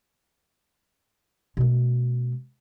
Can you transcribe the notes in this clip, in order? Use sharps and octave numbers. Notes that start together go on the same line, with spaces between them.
B2 A3